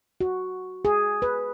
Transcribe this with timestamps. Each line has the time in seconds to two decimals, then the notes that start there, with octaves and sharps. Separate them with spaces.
0.21 F#4
0.85 G#4
1.22 B4